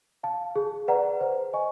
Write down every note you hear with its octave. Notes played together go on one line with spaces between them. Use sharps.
F5 A5
G#4
B4 D5 F#5 A#5
C5
D#5 G#5 C#6